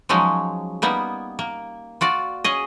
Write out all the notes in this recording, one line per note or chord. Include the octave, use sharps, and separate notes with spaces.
F3 F#3 G#3 C#4 D#4
G3 A#3 B3 D#4
A#3
F4 F#4 D5
C#4 G#4 D#5